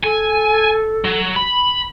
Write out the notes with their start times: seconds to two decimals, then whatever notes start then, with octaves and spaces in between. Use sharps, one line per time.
0.03 A4 G#5
1.05 F#3
1.36 B5